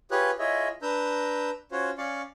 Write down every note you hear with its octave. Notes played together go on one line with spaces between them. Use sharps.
F4 G4 G#4 B4 C#5 F#6
E4 F4 G#4 C#5 D#5 E5
D4 B4 A#5 E6 G6
C#4 F4 F#4 C5 C#5
C#4 D5 F5 C#6